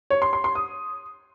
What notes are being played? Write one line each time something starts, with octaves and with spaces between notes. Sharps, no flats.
C#5
C6
C6
C6
D#6